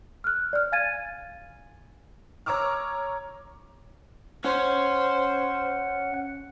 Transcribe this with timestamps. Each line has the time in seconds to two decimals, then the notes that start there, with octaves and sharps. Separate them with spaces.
0.24 F6 F#6
0.53 D5 F6
0.72 F5 G#5 G#6 A6 D#7
2.46 C#5 A#5 C#6 D6 E6 F6
4.44 C#4 C5 C#5 F#5